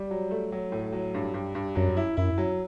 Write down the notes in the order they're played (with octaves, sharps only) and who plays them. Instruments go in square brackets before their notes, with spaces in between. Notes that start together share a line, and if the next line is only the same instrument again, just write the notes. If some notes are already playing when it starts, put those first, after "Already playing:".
Already playing: [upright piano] G3
F#3
A3
F#3
A2
F#3
G2
G2
G2
[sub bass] F#2 [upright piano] F#3
[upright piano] E4
[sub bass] F#2 [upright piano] E4
[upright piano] F#3